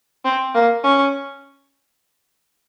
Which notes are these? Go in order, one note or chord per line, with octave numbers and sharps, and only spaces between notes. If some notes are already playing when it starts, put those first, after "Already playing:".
C4
A#3
C#4